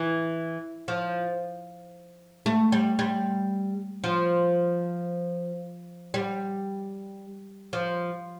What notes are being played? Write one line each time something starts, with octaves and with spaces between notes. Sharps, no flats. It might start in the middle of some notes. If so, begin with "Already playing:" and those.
Already playing: E3
F3
A3
G3
G3
F3
G3
F3